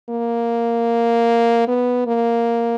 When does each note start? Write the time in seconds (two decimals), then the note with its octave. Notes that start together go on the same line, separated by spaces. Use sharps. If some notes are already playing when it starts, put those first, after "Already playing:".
0.09 A#3
1.68 B3
2.07 A#3